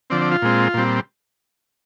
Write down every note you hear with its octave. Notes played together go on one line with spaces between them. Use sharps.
D3 F3 C4 D5
D5
F4
A#2 G#3 C4
A#2 G3 C4